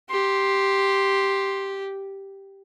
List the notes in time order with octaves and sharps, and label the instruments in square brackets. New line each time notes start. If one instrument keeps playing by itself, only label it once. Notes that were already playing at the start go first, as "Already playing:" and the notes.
[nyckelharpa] G4 [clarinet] C6